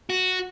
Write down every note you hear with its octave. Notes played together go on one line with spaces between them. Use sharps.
F#4